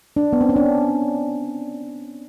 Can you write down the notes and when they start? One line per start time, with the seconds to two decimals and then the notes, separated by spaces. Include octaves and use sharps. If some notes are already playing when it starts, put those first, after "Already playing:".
0.16 D4
0.33 B3
0.41 C4
0.49 C#4
0.56 D4